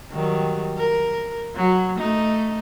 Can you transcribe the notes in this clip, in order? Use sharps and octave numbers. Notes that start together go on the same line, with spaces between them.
D#3 F#3 G3
A#4
F#3
A3 D#4